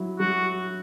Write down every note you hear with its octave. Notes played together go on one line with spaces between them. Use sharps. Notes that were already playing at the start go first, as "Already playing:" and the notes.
Already playing: F#3 E4
F#3 F#4